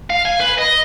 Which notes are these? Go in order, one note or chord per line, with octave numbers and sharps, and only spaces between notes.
F5
G#5
B4
D#5